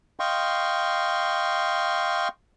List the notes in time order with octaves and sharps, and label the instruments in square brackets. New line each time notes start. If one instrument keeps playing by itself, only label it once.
[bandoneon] D#5 F5 G5 C6 C#6